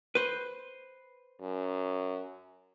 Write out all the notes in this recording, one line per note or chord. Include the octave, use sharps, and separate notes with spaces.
B4 C5
F#2